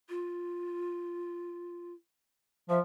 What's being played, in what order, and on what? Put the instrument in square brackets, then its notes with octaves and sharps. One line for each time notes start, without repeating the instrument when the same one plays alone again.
[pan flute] F4
[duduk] F3 [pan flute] E5